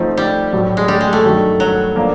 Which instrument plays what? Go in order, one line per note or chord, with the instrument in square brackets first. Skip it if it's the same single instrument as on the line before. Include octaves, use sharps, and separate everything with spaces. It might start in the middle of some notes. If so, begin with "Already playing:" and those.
Already playing: [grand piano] F3 A3 C4 D#4
[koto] G3
[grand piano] A2 F#3 A3
[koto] G#3
G3
G#3
A3
[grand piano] G2 D#3 F#3
[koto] F#3
[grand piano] F3 A#3 D4 F4 A#4